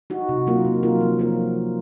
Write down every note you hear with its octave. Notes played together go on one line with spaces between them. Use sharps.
D#4 F#4
C3
F#3 A#3 F4 A#4
C3
F#3 A#3 F4 A#4
F3
A#3 F4 A#4